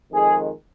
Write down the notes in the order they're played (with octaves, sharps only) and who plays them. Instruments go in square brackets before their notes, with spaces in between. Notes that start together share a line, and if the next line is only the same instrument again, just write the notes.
[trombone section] F2 D#3 G#3 G#4